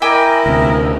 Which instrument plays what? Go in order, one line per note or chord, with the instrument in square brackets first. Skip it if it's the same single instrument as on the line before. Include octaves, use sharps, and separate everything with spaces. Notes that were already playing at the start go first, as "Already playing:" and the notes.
[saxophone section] E4 D#5 [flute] A#4 [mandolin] G5 G#5 D6
[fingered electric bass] D2 C3